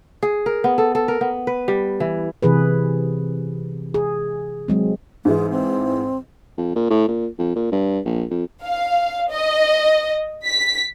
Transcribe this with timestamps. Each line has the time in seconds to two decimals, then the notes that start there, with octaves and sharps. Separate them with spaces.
0.23 G#4
0.46 A#4
0.64 B3
0.78 A4
0.95 A4
1.08 A#4
1.21 B3
1.47 B4
1.68 G3
2.00 E3
2.42 C3 E3 G#4 B4
3.94 G#4
4.68 F#3 G#3 C4
5.25 G#2 E3 G#3 E4
5.50 C4
6.57 F2
6.75 A#2
6.90 A2
7.08 A#2
7.39 F2
7.55 A#2
7.72 G2
8.05 A#1
8.30 F2
8.63 F5
9.31 D#5
10.46 B6